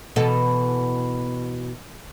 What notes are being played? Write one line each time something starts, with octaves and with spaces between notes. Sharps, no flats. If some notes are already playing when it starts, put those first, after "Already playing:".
B2 E3 A4